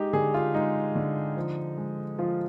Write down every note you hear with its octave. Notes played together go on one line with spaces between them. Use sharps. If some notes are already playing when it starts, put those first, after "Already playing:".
Already playing: G#3 D#4 G4
D3 G#4
F4
G#3 D#4
D3
F3
G#3
F3 F4